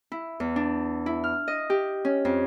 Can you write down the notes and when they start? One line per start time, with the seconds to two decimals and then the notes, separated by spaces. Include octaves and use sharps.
0.12 E4
0.40 E2
0.56 D4
1.06 E4
1.24 F6
1.48 D#5
1.70 G4
2.05 C#4
2.25 F2